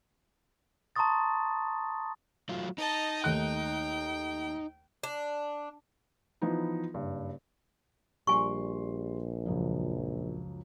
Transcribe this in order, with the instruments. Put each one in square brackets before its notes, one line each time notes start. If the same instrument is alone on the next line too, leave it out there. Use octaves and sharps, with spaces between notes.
[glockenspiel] A5 A#5 C6 C#6 D#6 A6
[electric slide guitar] F#3 A3 F4
[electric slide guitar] D#4 [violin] D#5 A5
[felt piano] D#2 A3 F#6 [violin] G5
[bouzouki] D4
[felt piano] E3 F3 B3 D#4
F#1 G2
[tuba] A#1 [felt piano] G3 D5 C6 [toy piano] G#5 C#6
[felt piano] C#2 F#2 F3